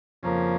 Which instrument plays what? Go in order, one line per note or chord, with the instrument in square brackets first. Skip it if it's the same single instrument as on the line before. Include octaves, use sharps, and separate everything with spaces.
[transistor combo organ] F2 C#3 F3 A#3